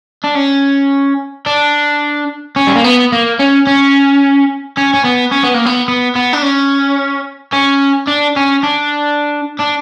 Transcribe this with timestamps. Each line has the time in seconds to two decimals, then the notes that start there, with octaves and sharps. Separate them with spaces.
0.24 D4
0.36 C#4
1.46 D4
2.56 C#4
2.67 G3
2.75 A#3
2.84 B3
3.12 A#3
3.39 C#4
3.67 C#4
4.77 C#4
4.94 C#4
5.04 B3
5.32 C#4
5.44 B3
5.55 A#3
5.66 B3
5.88 B3
6.15 B3
6.33 D4
6.42 C#4
7.53 C#4
8.08 D4
8.36 C#4
8.63 D4
9.59 D4